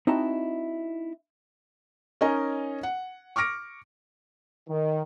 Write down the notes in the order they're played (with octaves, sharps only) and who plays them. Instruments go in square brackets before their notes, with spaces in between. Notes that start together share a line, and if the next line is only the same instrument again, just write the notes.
[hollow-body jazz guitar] C4 D#4 E4 F#4 D#5 A5
[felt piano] C#4 D#4 A#4 D#5 G#5
F#5
C#6 D6 F6 A#6 D7
[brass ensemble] D#3